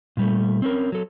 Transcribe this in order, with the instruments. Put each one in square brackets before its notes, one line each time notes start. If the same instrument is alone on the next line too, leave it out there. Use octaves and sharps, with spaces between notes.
[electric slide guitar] A#2 G3 A3
C4 C#4 A#4
F#3 A4